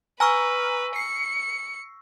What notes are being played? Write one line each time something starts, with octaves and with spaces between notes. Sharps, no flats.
B4 G#5 A#5 C#6 E6 F6 A#6
C7 C#7